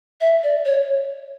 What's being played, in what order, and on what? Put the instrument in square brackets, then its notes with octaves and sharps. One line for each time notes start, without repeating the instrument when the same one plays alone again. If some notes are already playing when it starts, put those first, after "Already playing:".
[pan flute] E5
D5
C#5